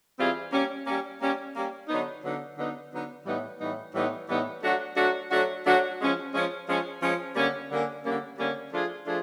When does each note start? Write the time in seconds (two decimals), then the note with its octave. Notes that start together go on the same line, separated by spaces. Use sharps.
0.18 E3 G3 C4 F4 G#4
0.52 G3 A#3 C#4
0.87 G3 A#3 C#4
1.21 G3 A#3 C#4
1.55 G3 A#3 C#4
1.89 D3 F#3 B3 D#4
2.23 D3 F#3 B3 D#4
2.57 D3 F#3 B3 D#4
2.92 D3 F#3 B3 D#4
3.26 A2 E3 G3 B3 D#4
3.59 A2 E3 G3 B3 D#4
3.94 A2 E3 G3 B3 D#4
4.28 A2 E3 G3 B3 D#4
4.63 F#3 A3 D4 F#4
4.96 F#3 A3 D4 F#4
5.31 F#3 A3 D4 F#4
5.65 F#3 A3 D4 F#4
5.99 F3 G#3 C#4
6.34 F3 G#3 C#4
6.67 F3 G#3 C#4
7.01 F3 G#3 C#4
7.36 D3 G3 A#3 C#4
7.70 D3 G3 A#3 C#4
8.05 D3 G3 A#3 C#4
8.38 D3 G3 A#3 C#4
8.72 F3 A3 D4 F4 G#4
9.06 F3 A3 D4 F4 G#4